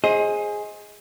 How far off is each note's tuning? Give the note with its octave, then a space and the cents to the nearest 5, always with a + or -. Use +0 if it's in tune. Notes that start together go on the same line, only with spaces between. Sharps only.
G#4 +0 C5 +30 D#5 +20